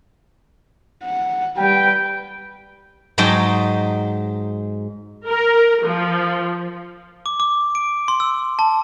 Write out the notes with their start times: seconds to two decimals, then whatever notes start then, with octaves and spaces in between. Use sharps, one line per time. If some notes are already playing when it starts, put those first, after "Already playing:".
1.04 F#5
1.57 G3 B4 G5
3.18 G#2 F#3 G#3 D#4 G5 A5
5.28 A#4
5.85 F3
7.26 D6
7.40 D6
7.75 D7
8.08 C6
8.20 E6
8.59 A5